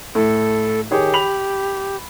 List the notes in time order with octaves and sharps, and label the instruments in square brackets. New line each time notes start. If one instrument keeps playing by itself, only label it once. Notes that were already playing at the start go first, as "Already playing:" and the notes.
[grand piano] A2 [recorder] A4
[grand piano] D#3 G#4 C#5 [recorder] G4
[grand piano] B5 F7 F#7